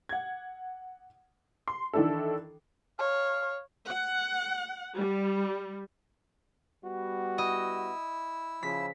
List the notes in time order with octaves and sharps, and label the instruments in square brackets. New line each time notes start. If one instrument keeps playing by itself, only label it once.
[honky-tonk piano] F#5 G#6
C6
D#3 E3 D4 E4 A4
[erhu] C#5 [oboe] F5
[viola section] F#5
G3
[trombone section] G3 B3 F#4
[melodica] E4 E6 [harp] D#5
[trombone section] C#3 F3 [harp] B6